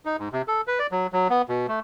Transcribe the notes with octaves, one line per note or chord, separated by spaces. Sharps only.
D#4
G#2
C3
A4
B4
D5
F#3
F#3
B3
B2
A3